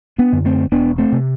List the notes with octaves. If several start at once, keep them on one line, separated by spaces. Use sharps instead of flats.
B3 D4
F#2 D3
A3 C4
E1 B3 D4
A3 C4
C3